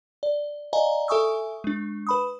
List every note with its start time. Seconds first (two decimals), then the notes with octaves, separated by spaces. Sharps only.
0.23 D5
0.73 D5 D#5 F5 G#5 A#5
1.08 A4 E5 G#5 C#6 D#6 E6
1.64 G#3 D4
2.07 B4 B5 D#6